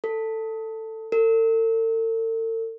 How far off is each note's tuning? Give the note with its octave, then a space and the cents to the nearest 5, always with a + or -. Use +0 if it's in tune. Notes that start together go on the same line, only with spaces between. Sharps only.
A4 +15
A4 +45